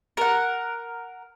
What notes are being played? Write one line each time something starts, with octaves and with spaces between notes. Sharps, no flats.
A#4 F#5